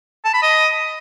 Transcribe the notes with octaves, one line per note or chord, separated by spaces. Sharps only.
A5
B5
D#5